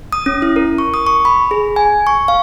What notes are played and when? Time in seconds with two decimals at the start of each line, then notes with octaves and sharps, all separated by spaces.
0.12 D#6
0.26 C#4
0.42 E4
0.56 A#4
0.78 C#6
0.94 D#6
1.07 C#6
1.25 B5
1.51 G#4
1.76 G#5
2.07 C#6
2.28 F5